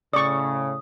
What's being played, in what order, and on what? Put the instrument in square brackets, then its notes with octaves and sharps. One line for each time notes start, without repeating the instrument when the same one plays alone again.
[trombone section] A2 C#3 [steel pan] D5 C#6 [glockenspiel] D#6